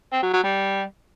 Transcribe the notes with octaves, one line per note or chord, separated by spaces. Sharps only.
C4
F#3
F#3
G3